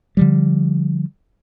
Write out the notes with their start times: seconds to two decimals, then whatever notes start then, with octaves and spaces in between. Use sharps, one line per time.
0.17 D3 F3 G3